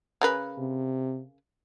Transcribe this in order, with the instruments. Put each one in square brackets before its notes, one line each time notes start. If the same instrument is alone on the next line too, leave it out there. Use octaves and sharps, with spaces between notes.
[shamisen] C#3 A#4 B4
[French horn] C3